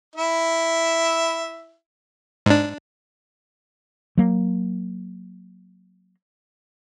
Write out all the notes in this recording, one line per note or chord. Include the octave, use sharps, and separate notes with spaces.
E4 E5
G#2 D4
F#3 A#3